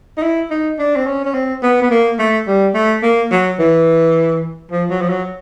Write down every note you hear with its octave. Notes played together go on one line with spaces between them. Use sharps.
D#4
E4
D#4
D4
C4
C#4
C#4
C4
B3
B3
A#3
A3
G3
A3
A#3
F#3
E3
F3
F#3
F3
F#3